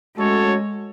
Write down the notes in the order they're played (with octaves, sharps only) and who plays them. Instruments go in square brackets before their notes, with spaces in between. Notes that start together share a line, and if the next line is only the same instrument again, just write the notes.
[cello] G#3 [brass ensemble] A3 C#4 F#4 A4 C#5